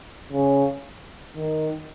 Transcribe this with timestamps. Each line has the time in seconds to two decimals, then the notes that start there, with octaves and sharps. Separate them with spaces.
0.32 C#3
1.37 D#3